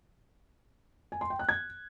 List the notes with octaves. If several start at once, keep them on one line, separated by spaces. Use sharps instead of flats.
G#5
C6
G5
F#6
G#6